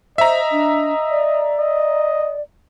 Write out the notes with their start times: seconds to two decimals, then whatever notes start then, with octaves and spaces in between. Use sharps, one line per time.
0.18 C5 D#5 E5 A#5
0.51 D4
1.10 D5
1.58 D#5